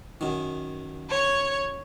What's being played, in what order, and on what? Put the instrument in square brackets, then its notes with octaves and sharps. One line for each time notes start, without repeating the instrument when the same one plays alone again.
[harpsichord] F#2 D#3
[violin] C#5